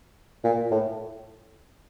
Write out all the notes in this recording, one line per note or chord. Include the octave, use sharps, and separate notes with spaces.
A#2
A2